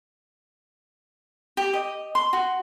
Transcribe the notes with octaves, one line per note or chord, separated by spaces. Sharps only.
G4
D#5
C6
F#4